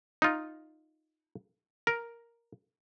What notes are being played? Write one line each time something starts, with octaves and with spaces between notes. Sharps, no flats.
D#4 F4
A#4